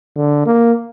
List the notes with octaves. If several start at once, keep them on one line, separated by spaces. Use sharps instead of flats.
D3
A#3